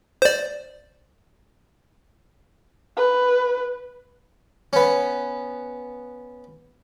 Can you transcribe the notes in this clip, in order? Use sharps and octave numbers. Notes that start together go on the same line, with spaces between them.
C5 D5
B4
B3 C#4